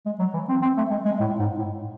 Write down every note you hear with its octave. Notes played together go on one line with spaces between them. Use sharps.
G#3
F#3
E3
C4
C4
A3
G#3
G#3
A2
G#2
A2